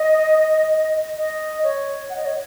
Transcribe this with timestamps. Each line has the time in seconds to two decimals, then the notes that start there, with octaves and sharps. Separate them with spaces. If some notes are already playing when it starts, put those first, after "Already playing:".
Already playing: D#5
1.18 D#5
1.63 C#5
2.10 F#5
2.16 D#5
2.25 C#5